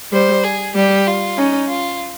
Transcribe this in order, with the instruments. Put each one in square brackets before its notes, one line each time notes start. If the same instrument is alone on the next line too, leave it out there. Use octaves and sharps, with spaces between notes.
[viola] G3 [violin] C5
[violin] G#4
[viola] G3 [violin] G4
[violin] F4
[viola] C#4 [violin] D#4
[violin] F4